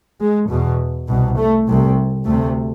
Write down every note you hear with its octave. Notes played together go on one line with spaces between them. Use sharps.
G#3
E2 B2
C2 B2
A3
C2 C3
D2 C3 A3